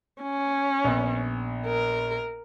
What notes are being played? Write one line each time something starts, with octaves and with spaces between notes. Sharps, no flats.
C#4
A#1 B3
A#4